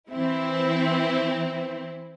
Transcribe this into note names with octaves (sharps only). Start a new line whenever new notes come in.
E3 C4 E4